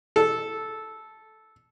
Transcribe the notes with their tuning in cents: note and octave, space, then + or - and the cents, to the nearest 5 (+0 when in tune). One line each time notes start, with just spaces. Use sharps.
A4 -10